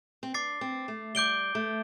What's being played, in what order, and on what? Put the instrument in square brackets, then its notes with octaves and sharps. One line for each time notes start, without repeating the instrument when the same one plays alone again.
[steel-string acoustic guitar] C4
[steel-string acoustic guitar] D4 [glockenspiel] D6 A6 C7
[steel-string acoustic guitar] C4
A3
[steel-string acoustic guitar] G3 [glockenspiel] D6 G6 D7 G7
[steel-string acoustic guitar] A3